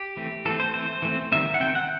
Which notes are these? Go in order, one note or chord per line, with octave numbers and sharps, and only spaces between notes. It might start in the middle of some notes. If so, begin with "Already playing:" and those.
Already playing: G4
E3 A3 C4
E3 A3 C4 A4
C5
E3 A3 C4 C5
E3 A3 C4
D#3 G3 C4 E5
F#5
D#3 G3 C4 G5
F#5